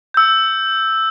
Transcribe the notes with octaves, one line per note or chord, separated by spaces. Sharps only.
E6 G6